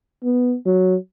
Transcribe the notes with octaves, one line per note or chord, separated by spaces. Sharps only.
B3
F#3